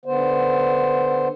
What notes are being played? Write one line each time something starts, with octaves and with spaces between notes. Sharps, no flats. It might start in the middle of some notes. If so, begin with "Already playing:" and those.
D3 B3 C5